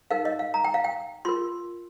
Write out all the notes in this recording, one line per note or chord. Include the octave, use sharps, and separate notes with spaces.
D#4 A#4 F5
D#5
F5
A#5
G5
F5
G5
F4 A#4 C6